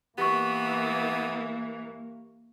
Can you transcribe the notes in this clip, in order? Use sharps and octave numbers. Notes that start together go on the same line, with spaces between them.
E3 A#3 B3 G4 C#6